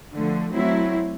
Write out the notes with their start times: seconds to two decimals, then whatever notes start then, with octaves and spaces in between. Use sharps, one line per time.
0.13 D3 F3 A3
0.53 F#3 A3 C4 E4